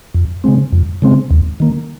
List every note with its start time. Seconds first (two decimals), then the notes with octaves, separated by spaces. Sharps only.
0.14 F2
0.44 C#3 G#3 C4
0.72 F2
1.02 C#3 G#3 C4
1.31 D#2
1.60 D#3 A#3